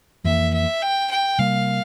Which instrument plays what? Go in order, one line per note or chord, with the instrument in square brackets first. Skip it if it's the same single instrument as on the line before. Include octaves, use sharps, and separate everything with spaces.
[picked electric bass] F2 E3 A#3 [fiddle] E5
[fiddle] E5
G5
G5
[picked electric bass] C3 G3 A#3 [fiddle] F5